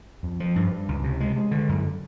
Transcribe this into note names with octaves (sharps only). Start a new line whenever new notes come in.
F2
F3
G2
G2
C#2
C3
G#3
G#3
D3
F#2